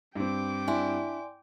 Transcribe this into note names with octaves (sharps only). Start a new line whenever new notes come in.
G2 C4 G5 D6
D4 E4 D5 G#5 C6